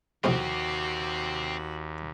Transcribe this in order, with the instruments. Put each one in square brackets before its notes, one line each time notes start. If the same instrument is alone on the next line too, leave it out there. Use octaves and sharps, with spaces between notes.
[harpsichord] A#1 A2 C3 [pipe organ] D#2 [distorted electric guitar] C4 G4 [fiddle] F#4